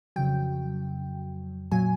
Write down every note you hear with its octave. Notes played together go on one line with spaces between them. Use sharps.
F2 C#3 F#3 G5
A#2 F#3 G#5